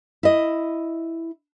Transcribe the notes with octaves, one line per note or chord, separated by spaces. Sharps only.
E4 D#5